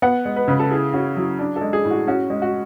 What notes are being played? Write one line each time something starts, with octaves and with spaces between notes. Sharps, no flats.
B3 F#5
G#3
B4
C#3 B4
A4
E4 G#4
C#4 F#4
F#3 E4
D4
A4
G#3
G#4
A2
F#4
C#4 F#4
G#3
F#4